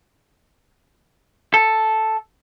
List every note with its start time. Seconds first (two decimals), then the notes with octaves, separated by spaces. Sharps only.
1.54 A4